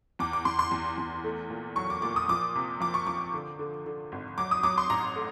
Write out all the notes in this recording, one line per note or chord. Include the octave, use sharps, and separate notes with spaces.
E2 D6
D6
E2 C6
C6
E2
E2
A3
A#2
F#3 C#6
D6
A#2 D6
D#6
F3 D6
C3
F3 D6
C#6
F3 D6
D3
D3
D3
G#1
F#3 D6
D#6
F#3 D6
C6
A1 A#5
A3